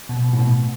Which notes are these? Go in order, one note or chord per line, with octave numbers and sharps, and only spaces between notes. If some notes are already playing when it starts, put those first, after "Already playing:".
B2
B2
A2
B2